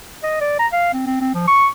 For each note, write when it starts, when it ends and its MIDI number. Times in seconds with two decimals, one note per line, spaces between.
0.23 0.36 75
0.41 0.59 74
0.59 0.67 82
0.72 0.92 77
0.93 1.01 60
1.06 1.17 60
1.21 1.32 60
1.34 1.43 53
1.48 1.67 85